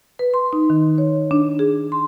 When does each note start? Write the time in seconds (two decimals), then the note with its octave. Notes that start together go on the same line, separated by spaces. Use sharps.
0.19 B4
0.34 C6
0.53 D#4
0.70 D#3
0.98 C#5
1.31 D4
1.59 G#4
1.92 C6